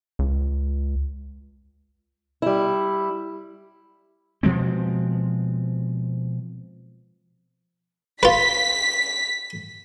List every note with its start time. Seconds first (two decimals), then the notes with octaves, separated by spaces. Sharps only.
0.19 C#2
2.42 G3 E4
4.43 B2 F3 G#3 C4
8.23 F4 B4 B6